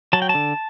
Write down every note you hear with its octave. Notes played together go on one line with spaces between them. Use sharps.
F#3 A5
G5
A5
D3